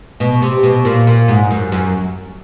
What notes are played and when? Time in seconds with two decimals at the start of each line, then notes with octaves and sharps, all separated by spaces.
0.20 B2
0.42 C3
0.63 B2
0.85 A#2
1.07 A#2
1.28 G#2
1.51 F#2
1.72 F#2